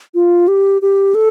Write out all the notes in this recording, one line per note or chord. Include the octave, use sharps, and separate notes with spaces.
F4
G4
G4
A4